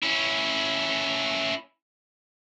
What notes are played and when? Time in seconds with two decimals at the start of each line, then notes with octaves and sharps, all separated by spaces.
0.03 C#4 E4